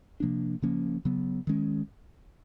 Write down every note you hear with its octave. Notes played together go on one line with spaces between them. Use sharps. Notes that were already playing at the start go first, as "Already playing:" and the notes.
C3 F3 A#3 D4
C#3 F3 A#3 C#4
C#3 F#3 B3
D#3 G#3 C#4